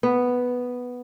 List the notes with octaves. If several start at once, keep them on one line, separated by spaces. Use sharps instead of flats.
B3